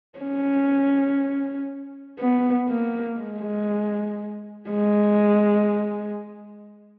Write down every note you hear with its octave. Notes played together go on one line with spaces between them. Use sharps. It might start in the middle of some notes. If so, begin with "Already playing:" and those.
C#4
B3
A#3
G#3
G#3